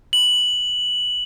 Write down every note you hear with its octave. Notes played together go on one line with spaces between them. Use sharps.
F#7